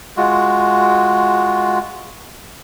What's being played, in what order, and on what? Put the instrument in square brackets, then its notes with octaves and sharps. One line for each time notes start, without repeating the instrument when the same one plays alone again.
[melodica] G#3 F4 F#4